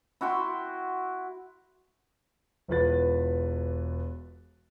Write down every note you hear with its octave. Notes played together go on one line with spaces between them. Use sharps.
E4 F#4 G5 C6
E1 E2 F4 B4 A6